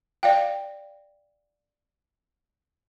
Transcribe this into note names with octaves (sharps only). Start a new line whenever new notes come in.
D5 F5 G5